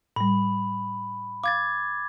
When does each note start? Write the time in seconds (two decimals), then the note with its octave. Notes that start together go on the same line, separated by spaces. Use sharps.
0.16 A2 G3 B5
1.44 F5 D6 G#6 A6